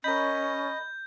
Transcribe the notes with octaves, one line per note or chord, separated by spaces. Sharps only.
C#4 A#4 D#5 B5 G6